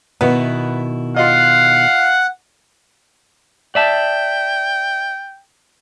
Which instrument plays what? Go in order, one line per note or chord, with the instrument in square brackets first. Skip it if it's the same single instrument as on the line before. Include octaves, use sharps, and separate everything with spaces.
[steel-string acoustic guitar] B2 D#3 E4 [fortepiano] B3
[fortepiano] F4 D#5 [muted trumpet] F5 [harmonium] F#5
[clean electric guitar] D5 E5 A5 [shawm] G5